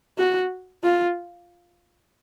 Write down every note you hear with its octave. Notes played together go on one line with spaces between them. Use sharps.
F#4
F4